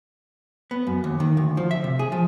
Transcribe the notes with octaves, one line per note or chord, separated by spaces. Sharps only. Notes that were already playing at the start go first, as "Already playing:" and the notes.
B3
F#2
D#2
D#3
D2
F3
E5
C3
G#4
F3